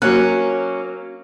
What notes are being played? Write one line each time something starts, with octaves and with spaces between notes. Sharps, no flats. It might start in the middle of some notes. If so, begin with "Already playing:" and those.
F#3 A#3 C#4 F#6